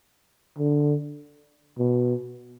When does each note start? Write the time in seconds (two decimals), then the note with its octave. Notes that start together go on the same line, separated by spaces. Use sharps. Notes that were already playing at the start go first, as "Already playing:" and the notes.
0.58 D3
1.78 B2